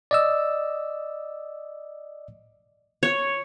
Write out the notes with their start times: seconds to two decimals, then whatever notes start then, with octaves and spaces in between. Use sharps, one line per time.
0.11 D5 D#5 E6
3.03 C#5